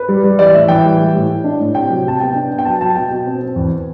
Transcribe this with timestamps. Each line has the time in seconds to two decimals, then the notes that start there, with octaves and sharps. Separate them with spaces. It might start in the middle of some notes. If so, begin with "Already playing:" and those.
Already playing: B4
0.08 G3
0.24 G3
0.39 E3 D5
0.54 A2 E5
0.68 E3 G5
0.85 G3
0.99 G3
1.15 A2
1.29 A2
1.44 D4
1.60 A2
1.75 C3 G5
1.90 F#3
2.05 C3 A5
2.20 B3 G5
2.35 D4
2.50 B3
2.59 G5
2.65 F#3 A5
2.81 F#3 A5
2.96 B2 G5
3.11 B2
3.26 C4
3.41 C4
3.56 E2